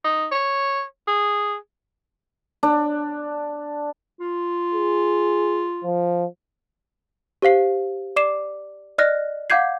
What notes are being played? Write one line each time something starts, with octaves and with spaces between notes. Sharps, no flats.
D#4
C#5
G#4
D4
F4
G#4
F3
G4 C5 F5 C7
D5 D6 C7 E7
D5 D#5 F6 F#6 A#6
F5 F#5 D6 G6 G#6 C7